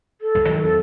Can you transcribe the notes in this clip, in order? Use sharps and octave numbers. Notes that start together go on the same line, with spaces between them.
A4
C#2 G2
D#3 F#3 G#3
E2 F#3 C4 A4